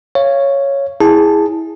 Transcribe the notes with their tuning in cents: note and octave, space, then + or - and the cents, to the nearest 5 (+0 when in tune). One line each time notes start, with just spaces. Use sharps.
C#5 +0 F5 -25
E4 -15 G#4 -10 A5 +0